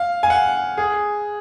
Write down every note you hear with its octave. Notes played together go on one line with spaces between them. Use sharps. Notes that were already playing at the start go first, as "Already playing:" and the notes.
Already playing: F5
G#5
F#5
G#4